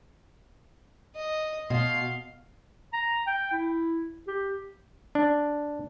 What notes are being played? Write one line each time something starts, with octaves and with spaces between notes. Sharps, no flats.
D#5
B2 F5 C6
A#5
G5
E4
G4
D4